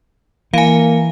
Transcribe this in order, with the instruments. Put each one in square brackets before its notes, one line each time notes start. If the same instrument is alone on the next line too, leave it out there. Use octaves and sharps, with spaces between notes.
[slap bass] E3 [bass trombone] A#3 [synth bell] F5 G#5